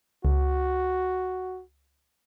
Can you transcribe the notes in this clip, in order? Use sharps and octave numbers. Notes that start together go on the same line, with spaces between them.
C#2 F#4